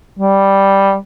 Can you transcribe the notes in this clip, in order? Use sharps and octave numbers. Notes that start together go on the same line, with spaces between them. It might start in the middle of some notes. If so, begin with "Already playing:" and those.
G3